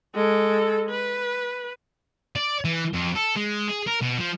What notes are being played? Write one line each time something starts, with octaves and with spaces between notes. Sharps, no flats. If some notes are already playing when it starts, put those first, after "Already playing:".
G#3 A4
B4
D5
E3
F2
A4
G#3
G#4
A#4
B2
F3